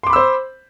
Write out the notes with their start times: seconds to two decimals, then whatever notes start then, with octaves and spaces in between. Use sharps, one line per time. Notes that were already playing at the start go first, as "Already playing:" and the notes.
0.03 C6
0.07 D6
0.10 B5
0.13 E6
0.16 C5